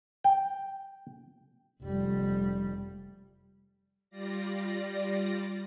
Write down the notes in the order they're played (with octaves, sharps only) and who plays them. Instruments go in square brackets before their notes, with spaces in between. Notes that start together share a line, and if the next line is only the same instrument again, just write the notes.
[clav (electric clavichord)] G5
[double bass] F1 G3
[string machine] G3 F4 D5 A#6